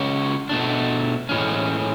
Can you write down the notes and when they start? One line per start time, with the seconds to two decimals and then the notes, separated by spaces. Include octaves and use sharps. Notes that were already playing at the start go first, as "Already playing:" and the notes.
Already playing: C#3 G#3 C#4 F#4 C#5
0.49 B2 A3 D4
1.29 A2 E3 G#3 C#4